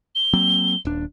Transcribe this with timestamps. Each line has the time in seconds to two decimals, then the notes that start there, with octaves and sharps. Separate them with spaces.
0.15 G7
0.33 F#3 A#3 C4
0.85 D#1 D4